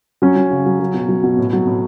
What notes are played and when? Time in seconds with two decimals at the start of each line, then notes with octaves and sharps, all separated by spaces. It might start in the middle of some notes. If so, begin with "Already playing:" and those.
0.22 F#3 C#4
0.36 F#3
0.51 C#3
0.66 F#3
0.80 F#3
0.94 B2
1.09 F#3
1.24 B2
1.38 A2
1.53 F#3
1.67 A2